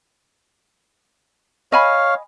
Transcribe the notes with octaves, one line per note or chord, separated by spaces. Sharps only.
C#5 D#5 F5 G#5 B5